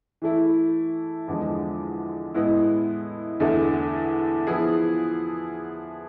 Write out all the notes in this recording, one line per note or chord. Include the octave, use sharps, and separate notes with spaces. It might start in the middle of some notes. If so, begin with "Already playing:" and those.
E3 A3 E4
E2 D3 F3 G#3
A2 G#3 B3 E4
E2 D3 A3
F3 B3 E4 G#4